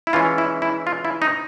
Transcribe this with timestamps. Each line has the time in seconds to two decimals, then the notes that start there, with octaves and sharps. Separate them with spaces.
0.07 E4
0.13 E3 G#3 C#4 F4
0.38 E4
0.62 E4
0.87 F4
1.05 E4
1.22 D#4